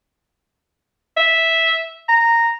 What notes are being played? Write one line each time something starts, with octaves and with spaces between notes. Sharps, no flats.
E5
A#5